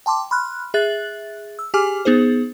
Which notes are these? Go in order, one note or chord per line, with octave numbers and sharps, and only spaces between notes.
G5 A5 C6 D6
B5 C6 F6 F#6
G#4 E5 F#6 A6 F#7
E6
G4 G#4 G#5 D6 F6
B3 D#4 G#4 C5